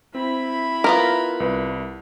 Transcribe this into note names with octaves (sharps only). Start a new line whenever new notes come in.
C4 E4 B5
B3 F4 A#4
C2 B4